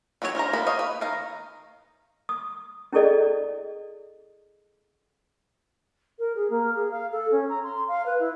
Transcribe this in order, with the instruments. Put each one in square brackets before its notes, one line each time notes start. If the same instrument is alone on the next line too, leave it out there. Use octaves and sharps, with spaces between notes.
[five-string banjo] D#3 F#3 C4 D4 C#5
D4 A#4 C5 A#5
D#3 A#3 B3 A#4 B5
G4 C#5 D#5 F5
B4
D#3 F5 A#5
[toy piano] D#6
C#4 E4 G#4 A4 D5 D#5
[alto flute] A#4
G#4
A#3
G#4
F5
A4
C#4
A#5
C6
F5
B4
E4